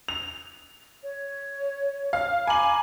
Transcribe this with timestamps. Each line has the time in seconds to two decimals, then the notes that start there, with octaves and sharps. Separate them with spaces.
0.08 F7
1.02 C#5
2.13 F5
2.47 G#5 A#5 B5 D6 F#7